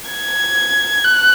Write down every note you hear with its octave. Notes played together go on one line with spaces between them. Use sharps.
G#6
F#6